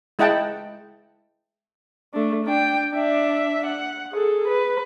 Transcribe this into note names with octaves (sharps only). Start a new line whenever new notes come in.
G#3 E4 D#5 F#5 G5 A5
A3 D4
D4 G5
D4 E5
F#5
G#4 A4
B4